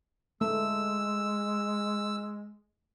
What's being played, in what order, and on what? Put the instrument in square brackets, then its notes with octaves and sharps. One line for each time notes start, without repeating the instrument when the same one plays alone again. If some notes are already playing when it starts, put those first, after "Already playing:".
[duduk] G#3 [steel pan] A3 [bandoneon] E6